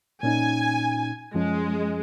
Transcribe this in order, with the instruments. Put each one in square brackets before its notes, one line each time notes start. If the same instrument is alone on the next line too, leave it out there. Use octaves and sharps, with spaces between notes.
[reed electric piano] A#2 C#4 D#4 [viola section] G#5
[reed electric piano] F#2 F3 C#4 [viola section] G#3